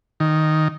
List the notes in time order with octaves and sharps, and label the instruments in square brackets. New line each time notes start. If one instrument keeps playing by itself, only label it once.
[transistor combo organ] D#3